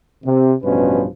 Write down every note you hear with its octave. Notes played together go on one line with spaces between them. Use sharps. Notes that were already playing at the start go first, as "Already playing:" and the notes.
C3
A1 G2 B2 F3 C#4 B4